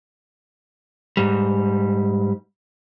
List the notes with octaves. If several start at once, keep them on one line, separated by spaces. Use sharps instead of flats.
G#2 G3